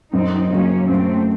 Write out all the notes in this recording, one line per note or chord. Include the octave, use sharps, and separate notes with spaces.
F#2 C4 D#4
C#3 F#3 A#3 C#4
F#2 A3 C4